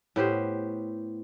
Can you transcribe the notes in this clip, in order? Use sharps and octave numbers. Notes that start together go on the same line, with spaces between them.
A2 B3 G4 C5